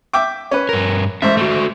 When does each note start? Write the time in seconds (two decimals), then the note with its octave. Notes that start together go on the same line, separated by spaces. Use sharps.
0.13 E5 G5 D6
0.51 C#4 B4
0.69 G2 A#4
1.22 A1 G#2 C5 E5
1.37 A3 F#4